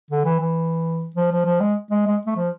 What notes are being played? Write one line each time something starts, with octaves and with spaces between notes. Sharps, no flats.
D3
E3
E3
F3
F3
F3
G#3
G#3
G#3
A3
F3